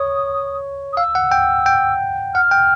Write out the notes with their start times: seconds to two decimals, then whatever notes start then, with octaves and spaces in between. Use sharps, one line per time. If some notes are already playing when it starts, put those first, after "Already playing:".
Already playing: C#5 D#6
0.93 D#6
0.97 F5 E6
1.15 F#5
1.32 G5
1.66 G5
2.34 F#5 F6
2.51 G5